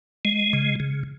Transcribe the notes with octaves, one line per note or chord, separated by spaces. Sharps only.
G#3
C#3
C#3